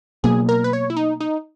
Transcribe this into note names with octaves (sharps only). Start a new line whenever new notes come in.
B2 F#3 A#3 G#4
A#4
B4
C#5
E4
D#4
D#4